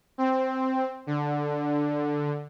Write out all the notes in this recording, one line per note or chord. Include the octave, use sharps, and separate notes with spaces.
C4
D3